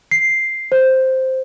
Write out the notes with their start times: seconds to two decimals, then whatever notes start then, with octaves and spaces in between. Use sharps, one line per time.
0.11 C7
0.72 C5